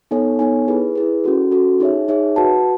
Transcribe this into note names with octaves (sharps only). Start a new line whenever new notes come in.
B3 D#4 A4 C#5 G#5
B3 D#4 A4 C#5 G#5
E4 G#4 B4
E4 G#4 B4
C#4 F#4 A4
C#4 F#4 A4
D#4 G#4 C#5 E5
D#4 G#4 C#5 E5
F#4 B4 F#5 A5